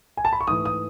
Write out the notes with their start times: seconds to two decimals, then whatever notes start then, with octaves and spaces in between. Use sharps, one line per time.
0.17 G#5
0.25 A5
0.33 B5
0.41 C#6
0.47 G#2 E3 A3 D#6
0.65 D#6